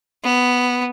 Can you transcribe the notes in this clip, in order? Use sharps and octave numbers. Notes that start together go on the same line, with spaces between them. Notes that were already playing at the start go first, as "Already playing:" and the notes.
B3